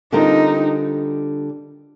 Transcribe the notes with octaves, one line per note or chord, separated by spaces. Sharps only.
D3 G3 C4 D#4 F4 A#4